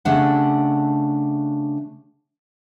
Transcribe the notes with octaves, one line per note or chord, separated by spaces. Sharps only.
C#3 A3 D4 G4 F#5